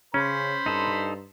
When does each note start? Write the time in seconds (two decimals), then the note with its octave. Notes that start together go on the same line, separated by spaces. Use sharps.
0.14 C#3 C#4 C5 B5
0.66 G2 D#4 A4